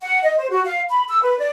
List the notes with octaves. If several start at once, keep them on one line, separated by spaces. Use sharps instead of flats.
F#5
D#5
C5
F#4
F5
B5
E6
B4
D5